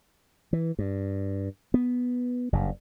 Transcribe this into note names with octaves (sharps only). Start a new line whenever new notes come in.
E3
G2
B3
F#1 G2